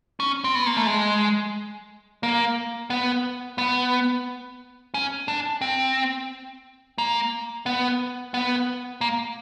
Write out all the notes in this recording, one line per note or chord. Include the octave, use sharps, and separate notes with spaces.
C#4
C4
B3
A#3
A3
G#3
A#3
B3
B3
C#4
D4
C4
A#3
B3
B3
A#3